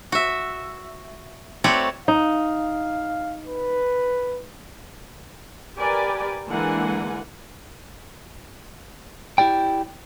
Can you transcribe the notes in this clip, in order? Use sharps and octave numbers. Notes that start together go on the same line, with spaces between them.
F#4 E5
A3 C4 F#4 B4 C#5 D5
D#4 F5
B4
G4 A#4 B4 D5 G5 G#5
D3 E3 G#3 A#3 F#5 G#5
E4 G4 D5 G5